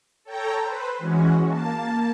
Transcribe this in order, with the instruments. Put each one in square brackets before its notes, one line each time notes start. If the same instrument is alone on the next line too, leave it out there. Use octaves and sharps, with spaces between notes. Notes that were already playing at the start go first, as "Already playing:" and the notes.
[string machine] A4 C#5 G5 A#5
B4 C5
E3 G#3 C#4 F#4
A#3 A5